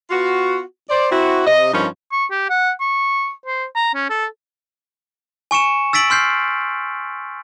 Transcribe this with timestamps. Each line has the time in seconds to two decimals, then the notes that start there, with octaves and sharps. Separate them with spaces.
0.10 B3 F4 F#4
0.89 C5 D5
1.10 C4 E4 F#4
1.46 C3 D#5
1.72 G2 F3 C#4 D#4 A#4
2.12 C#6
2.31 G4
2.50 F#5
2.81 C#6
3.46 C5
3.76 A#5
3.95 C#4
4.10 A4
5.51 G#5 C#6 C#7 E7
5.93 E6 A6 B6 D7 F#7
6.10 C6 F6 G6 C7